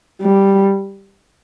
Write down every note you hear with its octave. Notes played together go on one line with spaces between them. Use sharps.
G3